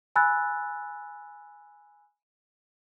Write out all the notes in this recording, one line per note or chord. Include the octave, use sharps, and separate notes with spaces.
G#5 B5 E6 F#6 A6